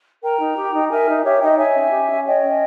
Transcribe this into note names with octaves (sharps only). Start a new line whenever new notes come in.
A#4 G5 A#5
D#4
G4
D#4
A#4 E5 G#5
D#4
G4 C#5 E5
D#4 D#5 G5
C#5 E5 G#5
C#4
G4
C#4
C#5 D#5 G5
C#4